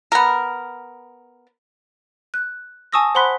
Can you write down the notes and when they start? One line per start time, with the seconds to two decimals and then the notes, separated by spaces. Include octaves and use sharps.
0.12 B3 A#4
2.34 F#6
2.92 G#5 A5 C#6 D#6 E6 A#6
3.15 C5 F#5 B5 C6 F#6 B6